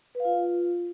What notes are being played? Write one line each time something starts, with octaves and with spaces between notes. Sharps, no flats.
B4
F5
F4